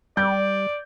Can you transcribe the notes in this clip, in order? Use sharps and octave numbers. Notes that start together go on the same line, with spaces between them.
G3 D5 G6